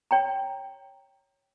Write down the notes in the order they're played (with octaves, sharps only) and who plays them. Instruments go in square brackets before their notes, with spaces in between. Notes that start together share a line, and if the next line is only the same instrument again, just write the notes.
[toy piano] C#5 G5 A#5